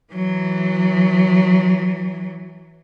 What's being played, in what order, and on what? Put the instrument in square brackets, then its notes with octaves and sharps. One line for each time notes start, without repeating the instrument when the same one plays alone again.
[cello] E3 F#3